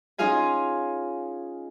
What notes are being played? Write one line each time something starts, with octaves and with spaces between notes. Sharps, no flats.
C#4 D#4 F4 G#4 F5 G#5